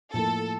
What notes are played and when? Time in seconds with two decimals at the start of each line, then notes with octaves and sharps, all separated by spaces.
0.13 A2 F3 A#3 A4